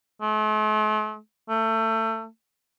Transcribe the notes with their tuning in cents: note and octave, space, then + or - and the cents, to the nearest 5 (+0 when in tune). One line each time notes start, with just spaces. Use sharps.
A3 -45
A3 +25